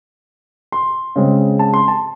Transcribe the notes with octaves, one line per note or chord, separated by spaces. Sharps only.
C6
C#3 G#3 C4
A5
C6
A5